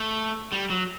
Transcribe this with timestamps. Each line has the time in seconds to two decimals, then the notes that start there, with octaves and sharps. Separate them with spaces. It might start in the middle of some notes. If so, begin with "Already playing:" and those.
Already playing: A3
0.52 G3
0.70 F#3